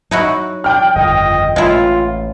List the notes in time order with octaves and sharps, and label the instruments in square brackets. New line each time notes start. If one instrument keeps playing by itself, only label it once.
[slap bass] F#3 [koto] D#4 E4 F#4
[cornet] D4 [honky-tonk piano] G5 F6
[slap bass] G1 F2 C#3 [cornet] D#5
[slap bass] A1 [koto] G#3 E4 [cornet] F4